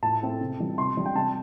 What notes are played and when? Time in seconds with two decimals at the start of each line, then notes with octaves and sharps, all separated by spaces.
0.02 A2 A5
0.22 A3 C4 E4
0.41 C3
0.59 E3 G3
0.78 C3 C6
0.97 G3 D4
1.06 G5
1.15 C3 A5